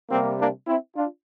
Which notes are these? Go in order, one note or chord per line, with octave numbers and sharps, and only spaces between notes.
C3 G3 A#3 C4
A#3 D4
C4 E4
D4 F4